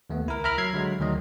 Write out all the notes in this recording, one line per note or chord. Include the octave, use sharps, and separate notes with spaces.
D#2 A3 B3
C#2 E4 A#4
A#4 E5 A#5 B5 F6
F#3 E5 G#6 C7
D3 F#3 G#3
D2 D#3 F#3 D#5